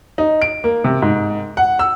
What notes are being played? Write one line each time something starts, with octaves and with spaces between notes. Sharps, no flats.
D#4
D7
A#3
C3
G#2
F#5
E6